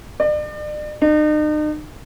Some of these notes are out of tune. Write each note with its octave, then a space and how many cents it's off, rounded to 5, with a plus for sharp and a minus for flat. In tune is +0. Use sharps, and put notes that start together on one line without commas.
D5 +40
D#4 -40